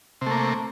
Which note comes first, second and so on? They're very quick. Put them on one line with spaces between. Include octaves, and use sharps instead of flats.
C3 A3 A#3